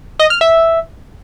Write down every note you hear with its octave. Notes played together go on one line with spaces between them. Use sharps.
D#5
F6
E5